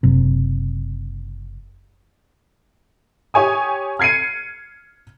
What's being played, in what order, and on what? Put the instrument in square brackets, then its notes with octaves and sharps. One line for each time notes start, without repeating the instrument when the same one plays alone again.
[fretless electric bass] F#1 C3
[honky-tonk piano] G4 C#5 G#5 D#6
F6 G#6 C7 C#7 D#7